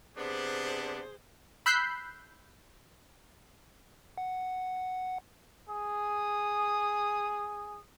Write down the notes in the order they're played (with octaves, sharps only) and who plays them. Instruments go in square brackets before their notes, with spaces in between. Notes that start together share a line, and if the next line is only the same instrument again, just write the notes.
[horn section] C3 B3 D4 [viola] G#4 C5
[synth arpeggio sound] B5 E6 F#6 G6 B6 C7
[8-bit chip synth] F#5
[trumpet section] G#4 D#6